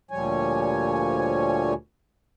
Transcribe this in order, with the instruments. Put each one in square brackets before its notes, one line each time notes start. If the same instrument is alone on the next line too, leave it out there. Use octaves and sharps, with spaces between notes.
[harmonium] D2 A#2 F3 G3 C#5 G#5